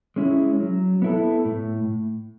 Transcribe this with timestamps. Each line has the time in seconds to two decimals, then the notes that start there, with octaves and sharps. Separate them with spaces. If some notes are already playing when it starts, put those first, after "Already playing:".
0.16 G#3 C#4 E4
0.60 F#3
1.02 B3 E4 A4
1.45 A2